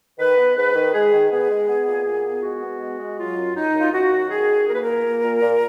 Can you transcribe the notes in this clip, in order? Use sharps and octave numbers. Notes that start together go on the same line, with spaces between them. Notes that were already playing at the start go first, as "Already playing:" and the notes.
D#3 B4
B3
G#2 B4
D#3
G#3 G#4
D#3
B3 G#4
G#3
B3
A#2
A#2
B3
G#3 F#4
B3
G#3
G#3
F#3 F4
F#2
F#2 D#4
F#2
F4
F#2 F#4
F#2
D#3 G#4
F#2
A#3 A#4
B4
A#2 A#4
A#3
A#2
A#2